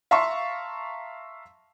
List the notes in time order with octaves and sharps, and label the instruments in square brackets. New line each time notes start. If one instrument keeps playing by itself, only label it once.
[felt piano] E5 F5 A5 A#5 C6 C#6